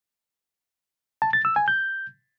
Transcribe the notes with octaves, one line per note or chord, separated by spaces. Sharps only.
A5
A6
E6
G#5
G6